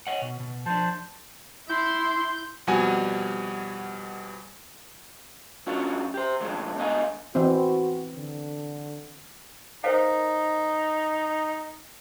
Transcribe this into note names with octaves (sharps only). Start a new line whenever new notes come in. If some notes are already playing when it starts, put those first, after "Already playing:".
C#5 D#5 F#5
B2
B2
F3 D4 C5 A5
E4 C6 G6
F2 B2 G3 F#4 G#5
F#3 C#4 D4 F4 F#4
G4 C5
D2 G2 D3 F3 G#3
B2 D3 G#3 D#5 F5 G#5
E3 C4 F#4
D3
D#4 A#4 C5 F5